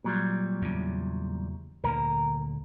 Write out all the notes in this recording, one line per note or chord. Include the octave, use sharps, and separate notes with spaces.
A#2 F#3 G3
E2 C#3
D2 A#2 D3 A#4